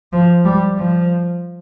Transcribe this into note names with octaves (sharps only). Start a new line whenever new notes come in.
F3
G3
F3